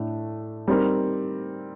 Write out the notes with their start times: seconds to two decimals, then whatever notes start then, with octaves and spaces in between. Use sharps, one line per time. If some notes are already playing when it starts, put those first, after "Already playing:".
Already playing: A2 A3 D4
0.68 G3 C4 D#4 A#4